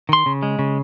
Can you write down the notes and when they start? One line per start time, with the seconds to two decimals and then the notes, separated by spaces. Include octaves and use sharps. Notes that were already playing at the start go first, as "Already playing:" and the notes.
0.09 D#3 C6
0.26 C#3
0.43 G#3
0.59 C#3